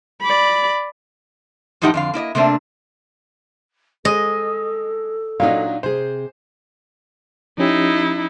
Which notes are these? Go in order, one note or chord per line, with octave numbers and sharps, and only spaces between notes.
D5 B5
F#2 A2 F3 D#4 G4 F#5
F2 D3 F5
A#3 E4 D5 D#5
C3 A3 A#3 C4 D4
G#3 A4 D#5
A#2 F#3 D4 D#4 F5
C3 G#4 C5
F3 C#4 D#4 E4 G4